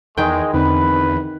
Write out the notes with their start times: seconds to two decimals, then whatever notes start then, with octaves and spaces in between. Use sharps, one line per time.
0.17 E2 D#3 G#3 G5 G#5
0.54 E2 D3 C4 D#4 B4